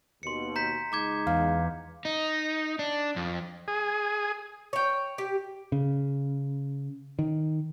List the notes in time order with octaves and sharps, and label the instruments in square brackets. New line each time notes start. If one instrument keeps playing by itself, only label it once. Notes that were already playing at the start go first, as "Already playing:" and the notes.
[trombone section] D#2 B2 [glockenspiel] C6 C#7
[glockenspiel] A#5 G6 B6
[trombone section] C#2 G#3 D#4 [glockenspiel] A#5 D6 G#6
[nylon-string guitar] E2 [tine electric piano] F5
[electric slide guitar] D#4
D4
F2
[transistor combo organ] G#4
[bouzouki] C#5 G5
G4
[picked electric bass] C#3
D#3